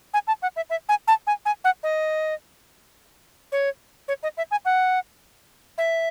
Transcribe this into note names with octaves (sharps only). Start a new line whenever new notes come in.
G#5
A5
F#5
E5
E5
G#5
A5
G#5
G#5
F#5
D#5
C#5
C#5
D#5
E5
G#5
F#5
E5